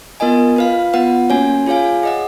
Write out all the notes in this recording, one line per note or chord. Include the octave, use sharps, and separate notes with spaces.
B3 F4 A#4 D#5 G#5
F4 B4 F5
B3 F4 B4 F#5
A#3 C#4 F#4 C#5 G#5
F4 G#4 C#5 F5 G#5
G#4 D#5 F#5